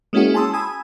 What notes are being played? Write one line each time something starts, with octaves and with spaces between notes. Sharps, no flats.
G#3 A#3 C#4 E4 F#4 G#4
G#5 A5 C6 D#6 E6
G#5 B5 D#6 E6 G#6